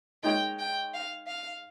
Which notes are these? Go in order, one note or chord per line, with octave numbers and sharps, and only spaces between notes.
G#3 D#4 A#4 C#5 G5
G5
F5
F5